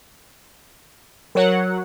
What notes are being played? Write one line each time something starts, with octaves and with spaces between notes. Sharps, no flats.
F#3 A#4 C#5 F#5